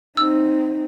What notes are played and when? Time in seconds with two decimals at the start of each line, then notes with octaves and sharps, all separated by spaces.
0.17 C4 D#4 E6